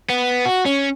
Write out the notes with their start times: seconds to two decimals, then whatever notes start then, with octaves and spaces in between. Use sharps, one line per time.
0.09 B3
0.46 F#4
0.66 C#4